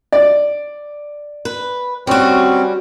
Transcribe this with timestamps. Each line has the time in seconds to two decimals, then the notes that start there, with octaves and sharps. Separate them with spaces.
0.12 D5
1.45 B4
2.07 G3 C4 C#4 F#4